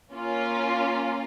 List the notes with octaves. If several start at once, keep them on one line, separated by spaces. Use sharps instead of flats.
A#3 C#4 F4